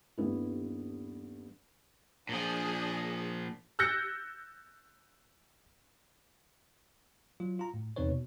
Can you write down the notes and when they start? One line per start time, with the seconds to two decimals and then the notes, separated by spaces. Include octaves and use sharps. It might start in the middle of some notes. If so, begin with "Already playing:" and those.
0.18 D#1 G2 B3 E4
2.29 A#2 F3 D4 G#4
3.79 E6 F#6 G6 A6 A#6 C#7
7.40 F#3 F4
7.59 F4 A#5
7.74 A2
7.96 E2 C3 C4 D#4 B4 C#5
8.09 B2